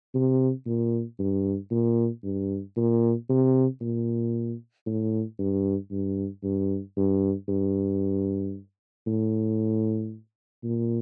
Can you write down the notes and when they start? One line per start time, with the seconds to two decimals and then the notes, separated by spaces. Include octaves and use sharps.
0.15 C3
0.66 A#2
1.19 G2
1.71 A#2
2.24 G2
2.77 A#2
3.30 C3
3.81 A#2
4.86 A2
5.39 G2
5.91 G2
6.43 G2
6.97 G2
7.48 G2
9.07 A2
10.63 A#2